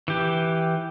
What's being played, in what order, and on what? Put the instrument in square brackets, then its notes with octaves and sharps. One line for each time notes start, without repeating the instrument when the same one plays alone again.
[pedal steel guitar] E3 G4